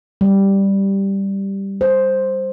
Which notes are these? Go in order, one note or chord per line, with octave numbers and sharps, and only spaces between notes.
G3
C5